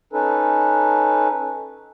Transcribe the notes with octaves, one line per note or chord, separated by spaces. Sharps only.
C#4 D#4 A4 B4